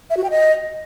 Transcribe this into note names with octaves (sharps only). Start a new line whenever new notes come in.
E5
F#4
G5
D#5